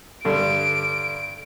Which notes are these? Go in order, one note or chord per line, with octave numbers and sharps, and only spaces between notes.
G2 D3 D7